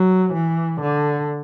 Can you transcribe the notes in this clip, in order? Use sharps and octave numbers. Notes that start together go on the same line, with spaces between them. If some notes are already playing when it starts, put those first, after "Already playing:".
Already playing: F#3
E3
D3